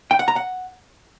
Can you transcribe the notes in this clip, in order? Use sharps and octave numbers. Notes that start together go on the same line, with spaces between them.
G5
F#5
A#5
F#5